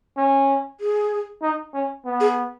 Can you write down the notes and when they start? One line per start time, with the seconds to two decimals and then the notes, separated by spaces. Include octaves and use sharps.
0.17 C#4
0.80 G#4
1.42 D#4
1.74 C#4
2.05 B3
2.20 G#4